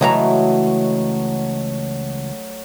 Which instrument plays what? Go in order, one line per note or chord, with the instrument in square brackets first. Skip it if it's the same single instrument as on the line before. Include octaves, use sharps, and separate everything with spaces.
[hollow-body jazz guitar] C#2 E3 A#5 [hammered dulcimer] F#3 A3 D#5